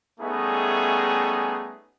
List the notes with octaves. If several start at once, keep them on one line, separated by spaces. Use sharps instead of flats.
G3 A3 B3 C#4 D#4 G#4